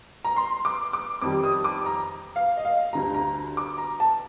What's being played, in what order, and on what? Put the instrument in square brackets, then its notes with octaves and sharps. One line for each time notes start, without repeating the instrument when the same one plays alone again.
[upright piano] A#5
C6
D6
D6
F2 D#3 G3 D6
D#6
D6
A#5
F5
D#5
F5
D2 D3 G3 A#5
A#5
D6
A#5
A5